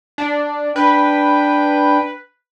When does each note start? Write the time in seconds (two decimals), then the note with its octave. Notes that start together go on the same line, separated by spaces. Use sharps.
0.18 D4
0.76 D4 B4 G5